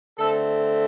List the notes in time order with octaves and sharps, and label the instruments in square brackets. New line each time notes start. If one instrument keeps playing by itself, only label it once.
[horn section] D3 A3 C4 A4